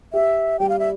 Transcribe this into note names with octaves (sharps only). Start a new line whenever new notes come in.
G4 E5
G3 G5
F5
E5